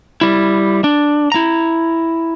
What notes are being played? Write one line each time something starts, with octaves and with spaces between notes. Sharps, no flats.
G3 E4
D4
E4 A#5